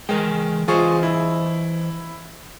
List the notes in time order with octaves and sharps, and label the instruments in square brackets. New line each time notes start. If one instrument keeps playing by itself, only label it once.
[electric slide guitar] E3 A#4 G5 [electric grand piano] G#3
[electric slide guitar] E3 C5 D#5 [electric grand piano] F4 G#4 C#6
[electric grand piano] E4